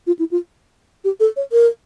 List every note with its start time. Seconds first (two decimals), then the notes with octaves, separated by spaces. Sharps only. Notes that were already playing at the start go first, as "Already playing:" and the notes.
0.07 F4
0.19 E4
0.31 F4
1.04 G4
1.20 A4
1.36 C#5
1.52 A#4